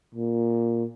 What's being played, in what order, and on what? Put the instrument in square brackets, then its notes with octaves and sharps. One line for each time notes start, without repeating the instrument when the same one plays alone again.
[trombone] A#2